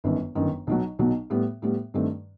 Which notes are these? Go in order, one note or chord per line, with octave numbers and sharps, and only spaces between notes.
G1 F#2 D#3
G1 F#2 D#3
B1 B2 F#3
B1 B2 F#3
A2 G3 B3
A2 G3 B3
G2 D#3 A3 C4